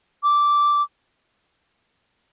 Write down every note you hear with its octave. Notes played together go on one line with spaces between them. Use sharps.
D6